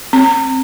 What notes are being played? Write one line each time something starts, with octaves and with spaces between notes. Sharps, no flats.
C4